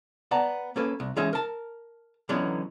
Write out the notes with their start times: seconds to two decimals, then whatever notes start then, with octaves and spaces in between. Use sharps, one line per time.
0.31 B3 D5 F#5 A5 A#5
0.76 A#3 C#4 A4 B4
1.00 C2
1.16 E3 G#3 C#4 D#4 G#4 E5
1.33 A#4 A5
2.29 D3 E3 F#3 B3 C#4 D#4